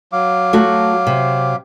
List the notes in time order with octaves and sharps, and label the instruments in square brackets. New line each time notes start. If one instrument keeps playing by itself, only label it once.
[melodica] F#3 F5 D6
[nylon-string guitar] A3 F#4
C3